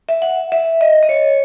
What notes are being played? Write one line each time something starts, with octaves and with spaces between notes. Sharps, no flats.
E5
F#5
E5
D#5
D#5
C#5